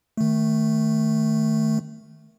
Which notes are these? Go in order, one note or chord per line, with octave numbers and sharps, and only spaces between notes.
D#3 A3